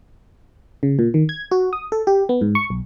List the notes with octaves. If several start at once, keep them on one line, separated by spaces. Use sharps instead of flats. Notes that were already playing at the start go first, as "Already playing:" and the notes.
C#3
A#2
D#3
G#6
F#4
D#6
A4
G4
B3
G#2
C#6
B1